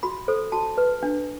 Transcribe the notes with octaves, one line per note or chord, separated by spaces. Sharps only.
F#4 B5
A4 C5
F#4 A5
B4
D4